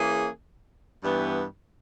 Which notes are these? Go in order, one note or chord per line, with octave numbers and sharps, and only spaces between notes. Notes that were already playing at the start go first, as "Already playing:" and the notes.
Already playing: E3 A#3 C#4 G#4
G2 E3 G3 B3